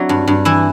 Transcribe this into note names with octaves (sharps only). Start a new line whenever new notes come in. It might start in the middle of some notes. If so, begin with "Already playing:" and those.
Already playing: F#3 C4 D4 E4 F#4
G2
G2
E3 E4